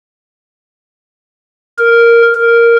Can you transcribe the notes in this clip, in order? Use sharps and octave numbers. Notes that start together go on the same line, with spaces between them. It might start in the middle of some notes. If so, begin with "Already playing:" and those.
A#4
A#4